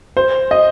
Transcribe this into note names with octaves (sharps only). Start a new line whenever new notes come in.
C5
D#5